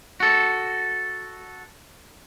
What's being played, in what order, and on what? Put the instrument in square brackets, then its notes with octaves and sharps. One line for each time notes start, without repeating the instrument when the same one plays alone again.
[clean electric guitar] F#4 A4